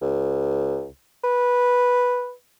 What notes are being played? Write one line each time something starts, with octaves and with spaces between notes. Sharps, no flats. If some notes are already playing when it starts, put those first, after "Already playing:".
C#2
B4